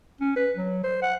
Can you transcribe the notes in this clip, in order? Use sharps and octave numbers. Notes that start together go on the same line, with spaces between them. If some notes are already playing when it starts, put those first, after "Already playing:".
C#4
B4
F#3
C5
F#5